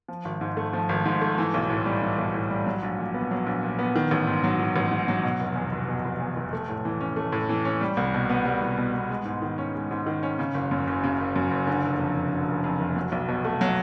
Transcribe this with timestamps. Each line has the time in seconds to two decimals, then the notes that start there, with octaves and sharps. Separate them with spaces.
0.08 F3
0.25 G#1
0.41 G#2
0.57 A3
0.73 F3
0.89 G#1
1.06 G#2
1.21 A3
1.38 E3
1.54 B1
1.70 A2
1.86 G3
2.02 E3
2.18 B1
2.34 A2
2.50 G3
2.66 F#3
2.83 A#1
2.98 A#2
3.14 B3
3.31 F#3
3.47 A#1
3.63 A#2
3.79 B3
3.96 D#3
4.11 A1
4.27 G#2
4.44 F#3
4.60 D#3
4.76 A1
4.91 G#2
5.08 F#3
5.23 B2
5.40 F1
5.56 E2
5.72 F1
5.88 B2
6.04 F1
6.20 E2
6.36 F1
6.53 A3
6.69 A2
6.85 E3
7.01 C#4
7.16 A3
7.32 A2
7.49 E3
7.65 C#4
7.81 G3
7.97 C2
8.14 B2
8.29 B3
8.45 G3
8.61 C2
8.78 B2
8.94 B3
9.10 G#3
9.25 G#2
9.42 D#3
9.58 C#4
9.75 G#3
9.91 G#2
10.07 D#3
10.23 C#4
10.39 C#3
10.54 F#1
10.71 F#2
10.87 F#1
11.04 C#3
11.20 F#1
11.36 F#2
11.51 F#1
11.67 D3
11.84 F1
11.99 F2
12.16 F1
12.32 D3
12.48 F1
12.64 F2
12.80 F1
12.96 F#3
13.12 B1
13.28 B2
13.45 A3
13.61 F#3